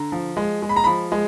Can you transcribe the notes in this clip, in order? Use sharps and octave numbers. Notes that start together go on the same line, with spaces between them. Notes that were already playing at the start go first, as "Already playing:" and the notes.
Already playing: D3 A#5
F3
G#3
G#3
B5
A#5
F3 B5
G#3